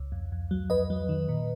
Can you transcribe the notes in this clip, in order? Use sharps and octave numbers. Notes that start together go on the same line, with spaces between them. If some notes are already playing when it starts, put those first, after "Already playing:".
Already playing: C#2
F2
F2
F#3
F2 B4 D#5
F#3
D#3
A#2